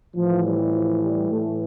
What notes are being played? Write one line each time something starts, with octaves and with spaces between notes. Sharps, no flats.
A2 E3 F3
G3
F3
G3
A2 E3 A3